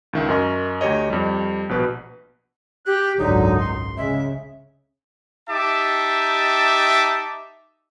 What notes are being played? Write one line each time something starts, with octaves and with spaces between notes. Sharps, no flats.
C#2 D#3 E5
F#2 A#4 D#5 C#6
D2 G4 C#5 D#5
F2 G3
A#1 B2 B4
G4 F#6
G#1 C#2 F#2 D3 F#3 D#4
C6
C#3 G#3 E5
D#4 G4 E5 A5 D6